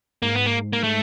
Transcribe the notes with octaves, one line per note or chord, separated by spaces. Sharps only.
G#2 A#3
B3
A#3
A#3
A3